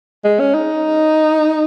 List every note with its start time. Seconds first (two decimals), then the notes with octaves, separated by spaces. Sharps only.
0.25 G#3
0.40 C#4
0.54 D#4